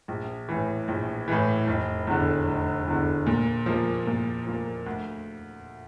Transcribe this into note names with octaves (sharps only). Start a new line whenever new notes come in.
A#1
A2 E3
A#1
A2 E3
F1
E2 D3
F1
E2 D3
A#2
F3 A#3
A#2
F3 A#3
D2